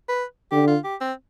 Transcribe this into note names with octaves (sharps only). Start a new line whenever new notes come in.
B4
D3 G4
F4
G4
C4